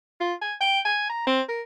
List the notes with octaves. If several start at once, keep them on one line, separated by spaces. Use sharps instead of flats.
F4
G#5
G5
G#5
A#5
C4
A#4